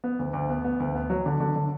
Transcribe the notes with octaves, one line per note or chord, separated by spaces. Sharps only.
B3
D2
D2
B3
B3
D2
B3
F#3
D3
D3
D3